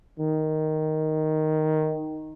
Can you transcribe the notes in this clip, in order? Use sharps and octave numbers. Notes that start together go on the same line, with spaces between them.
D#3